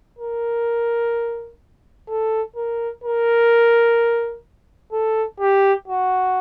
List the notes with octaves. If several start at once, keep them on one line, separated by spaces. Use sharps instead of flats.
A#4
A4
A#4
A#4
A4
G4
F#4